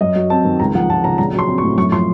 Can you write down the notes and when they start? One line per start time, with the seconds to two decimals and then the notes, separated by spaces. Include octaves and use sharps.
0.01 F#2 D#5
0.16 F#3
0.30 C4 A5
0.45 D#3
0.59 C#2 A#5
0.75 F3 F#5
0.89 C#2 A5
1.04 C#3 A#5
1.18 A#1 A#5
1.33 F#3
1.39 C6
1.48 C4
1.58 C#6
1.64 A2
1.78 F#2 C#6
1.92 F3 C6